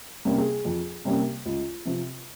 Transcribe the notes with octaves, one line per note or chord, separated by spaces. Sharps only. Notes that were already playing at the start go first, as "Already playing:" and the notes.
C3 G3 A#3 C#4
G#4
F2
C3 G3 A#3 C#4
C#2
C3 F3 C4